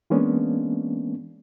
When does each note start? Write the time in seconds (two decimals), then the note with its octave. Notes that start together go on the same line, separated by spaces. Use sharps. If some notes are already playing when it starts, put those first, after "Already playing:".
0.10 E3 G#3 A#3 B3 C#4 D4